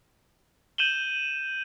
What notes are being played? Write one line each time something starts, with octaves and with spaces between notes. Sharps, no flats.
G6 D#7 E7 F#7 G7